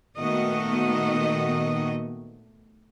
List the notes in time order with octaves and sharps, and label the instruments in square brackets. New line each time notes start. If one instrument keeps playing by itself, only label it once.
[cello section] A#2 D#3 A3 B3 F#4 D#5